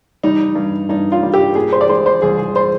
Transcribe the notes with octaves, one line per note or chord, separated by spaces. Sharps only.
G3 D#4
G2
G2 D#4
F4
G3
G4
A#2 G#4
C5
D5
G#3 C5
C5
C2 G#4
G#4
C5